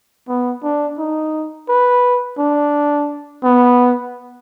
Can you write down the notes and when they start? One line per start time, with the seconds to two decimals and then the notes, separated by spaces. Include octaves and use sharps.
0.28 B3
0.63 D4
0.98 D#4
1.69 B4
2.38 D4
3.44 B3